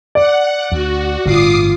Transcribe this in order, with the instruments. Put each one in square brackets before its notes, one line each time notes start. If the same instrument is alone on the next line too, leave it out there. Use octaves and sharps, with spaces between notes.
[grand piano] D5 [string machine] F#5
[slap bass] D2 [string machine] F#4
[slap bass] G1 A2 D3 [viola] F4 [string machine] D6 D#6 C7